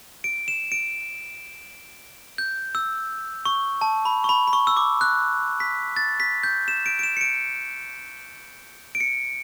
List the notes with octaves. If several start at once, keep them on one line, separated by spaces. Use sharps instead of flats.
D7
E7
D7
G6
E6
C#6
A5
B5
C#6
B5
B5
C#6
E6
D6
F#6
B6
A6
B6
G6
E7
D7
D7
E7
C#7
D7
D7
C#7